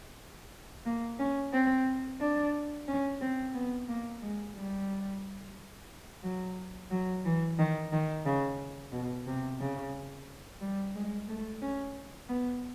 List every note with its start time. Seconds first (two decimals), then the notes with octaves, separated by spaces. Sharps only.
0.86 A#3
1.19 C#4
1.53 C4
2.20 D4
2.88 C#4
3.21 C4
3.54 B3
3.88 A#3
4.22 G#3
4.56 G3
6.23 F#3
6.91 F#3
7.25 E3
7.59 D#3
7.93 D#3
8.26 C#3
8.92 B2
9.27 C3
9.60 C#3
10.61 G3
10.95 G#3
11.28 A3
11.62 C#4
12.29 B3